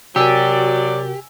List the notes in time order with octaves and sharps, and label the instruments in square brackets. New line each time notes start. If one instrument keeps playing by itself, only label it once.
[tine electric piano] C3 F#4 A#4 [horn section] F#3 D5 [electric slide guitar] G4 [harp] G#5 E6